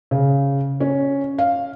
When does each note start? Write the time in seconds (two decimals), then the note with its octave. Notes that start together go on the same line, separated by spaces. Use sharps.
0.11 C#3
0.80 C#4
1.38 F5